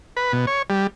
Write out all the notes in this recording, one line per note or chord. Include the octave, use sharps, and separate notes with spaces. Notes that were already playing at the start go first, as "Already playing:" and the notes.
B4
B2
C#5
G3